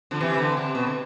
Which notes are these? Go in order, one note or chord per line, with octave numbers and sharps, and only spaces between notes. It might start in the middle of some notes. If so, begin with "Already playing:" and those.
D3 F3
C3 E3
D3
C3
B2
D3